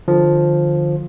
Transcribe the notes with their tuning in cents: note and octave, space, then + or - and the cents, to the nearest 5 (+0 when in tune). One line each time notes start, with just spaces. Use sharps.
D3 +35 F3 +5